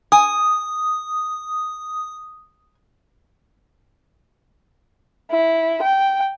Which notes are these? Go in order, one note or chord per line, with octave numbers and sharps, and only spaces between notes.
G#5 D#6
E4
G5